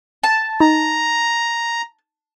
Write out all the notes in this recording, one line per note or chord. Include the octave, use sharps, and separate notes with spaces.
A5
D#4 A#5